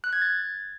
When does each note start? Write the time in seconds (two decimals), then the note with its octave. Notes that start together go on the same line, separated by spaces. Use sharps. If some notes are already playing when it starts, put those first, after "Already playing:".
0.04 F#6
0.13 G#6
0.22 A6